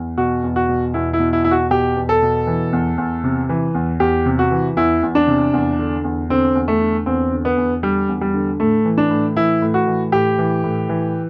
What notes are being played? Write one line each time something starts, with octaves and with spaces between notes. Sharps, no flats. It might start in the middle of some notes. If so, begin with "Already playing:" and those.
Already playing: E2
B2 F#4
E2
F#4
B2
E2 E4
E4
B2
E4
E2 E4
F#4
B2 G4
E2
A4
B2
E3
E2
E2
C3
E3
E2
E2 G4
C3
F#4
E3
E2 E4
E2
D4
C3
E2
D3
E2
D3 C4
E2
A3
D3
E2 C4
D3
B3
E2
D3 G3
E2
G3
D3
A2 A3
E3
D4
A2
E3 E4
A2
F#4
E3
A2 G4
E3
A2
E3